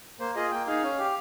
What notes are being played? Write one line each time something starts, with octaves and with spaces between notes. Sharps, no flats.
A#3 C5
F4 G#4 D#5
A#3 G5
D#4 G#4 F5
C#4
G4